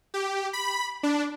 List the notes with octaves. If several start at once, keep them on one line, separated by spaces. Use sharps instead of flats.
G4
B5
D4